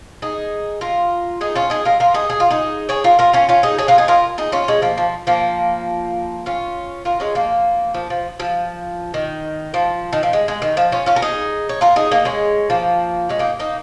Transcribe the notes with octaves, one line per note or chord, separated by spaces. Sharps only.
D#4 G#4
F4 A#4
D#4 G#4
C#4 F4
D#4 G#4
F4 A#4
F4 A#4
D#4 G#4
G#4
F4
D#4 G#4
G#4 C#5
F4 A#4
F4 A#4
C#4 F4
C#4 F4
D#4 G#4
G#4 C#5
F4 A#4
D#4 G#4
F4 A#4
D#4 G#4
C#4 F4
G#3 C#4
F3 A#3
F3
F3 A#3
C#4 F4
F4 A#4
G#3 C#4
F3 A#3
F3
F3
F3
D#3
F3
D#3
F3
G#3
G#3
D#3
F3
C#4 F4
C#4 F4
A#4
D#4 G#4
C#5
F4 A#4
D#4 G#4
A#3 D#4
G#3 C#4
F3 A#3
G#3 C#4
A#3 D#4
A#3 D#4